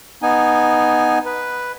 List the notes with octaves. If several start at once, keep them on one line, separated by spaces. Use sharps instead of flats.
B3 D#4 G#5
B4